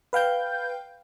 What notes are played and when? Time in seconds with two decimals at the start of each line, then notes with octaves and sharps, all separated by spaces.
0.13 B4 F5 G5 G6